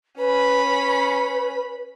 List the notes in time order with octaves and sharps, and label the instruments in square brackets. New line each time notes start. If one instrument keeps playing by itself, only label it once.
[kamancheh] C#4 B5 [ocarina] B4
[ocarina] B4